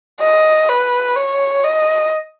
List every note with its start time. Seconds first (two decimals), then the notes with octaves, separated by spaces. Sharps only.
0.20 D#5
0.68 B4
1.16 C#5
1.64 D#5